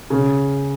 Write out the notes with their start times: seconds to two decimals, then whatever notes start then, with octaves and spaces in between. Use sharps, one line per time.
0.10 C#3